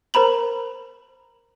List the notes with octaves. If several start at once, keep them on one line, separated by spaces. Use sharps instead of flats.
A#4 C5 A#5 B5 F#7